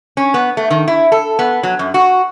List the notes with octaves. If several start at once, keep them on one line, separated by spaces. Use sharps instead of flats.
C#4
B3
A3
D#3
E4
A4
B3
F#3
F#2
F#4